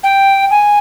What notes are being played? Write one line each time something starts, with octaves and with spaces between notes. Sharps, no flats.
G5
G#5